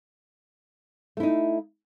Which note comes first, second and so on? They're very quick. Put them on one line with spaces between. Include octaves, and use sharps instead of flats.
A3 E4 D#4